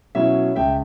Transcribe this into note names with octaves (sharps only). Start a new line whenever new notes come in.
B2 F#3 C#4 E4 E5
C#2 E5 G5